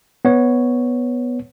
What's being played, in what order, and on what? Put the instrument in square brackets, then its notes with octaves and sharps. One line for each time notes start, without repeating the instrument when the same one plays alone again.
[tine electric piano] B3 C#5